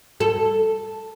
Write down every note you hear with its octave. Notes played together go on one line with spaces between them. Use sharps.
A4